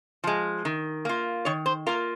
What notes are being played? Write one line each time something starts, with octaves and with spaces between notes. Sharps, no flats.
F3 G#3
D#3
A#3 F4
D#3 C#5
C5
A#3 F4 A#4